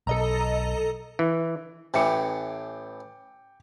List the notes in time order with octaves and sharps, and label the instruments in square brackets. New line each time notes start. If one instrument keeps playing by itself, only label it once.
[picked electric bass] B1 [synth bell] A4 D#5 A#5
[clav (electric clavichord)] E3
[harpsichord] A1 A2 E3 [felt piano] G5 D6 C#7